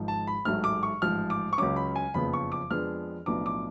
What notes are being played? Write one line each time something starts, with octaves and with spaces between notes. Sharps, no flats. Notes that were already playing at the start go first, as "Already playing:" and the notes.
Already playing: G#1 G#2 F3
A5
B5
A1 G#2 F#3 A3 F6
D6
C#6
A1 G#2 F3 F6
D6
C#6
C#2 C#3 F#3 C#4 D6
B5
G#5
F#1 F2 C#3 F3 B3 B5
C#6
D6
F2 F3 G#3 B3 D4 F6
B1 A2 F3 B3 D4 D6
D6